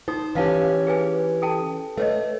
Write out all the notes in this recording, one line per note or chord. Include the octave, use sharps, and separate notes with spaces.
D#4 C5 D#6
E3 C#4 G4 B4 F5 A5
G#4 B4 G#5
A4 G5 A5
A3 B4 C#5 D#5